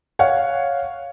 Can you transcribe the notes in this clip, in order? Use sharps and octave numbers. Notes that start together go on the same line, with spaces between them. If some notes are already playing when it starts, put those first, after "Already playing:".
C#5 F5 F#5